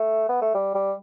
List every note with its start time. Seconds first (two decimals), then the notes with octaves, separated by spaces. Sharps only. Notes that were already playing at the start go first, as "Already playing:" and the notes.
Already playing: A3
0.29 B3
0.42 A3
0.54 G3
0.75 G3